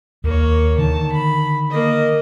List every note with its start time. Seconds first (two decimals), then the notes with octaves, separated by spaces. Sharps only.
0.24 D#2 A#3 C#5
0.78 D3 D#3 A5
1.12 B5
1.70 A#3 D#5